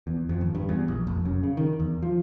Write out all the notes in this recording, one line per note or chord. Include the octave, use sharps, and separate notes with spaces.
E2
F2
G#1
G2
E2
A#1
F1
F#2
C#3
D#3
E2
F3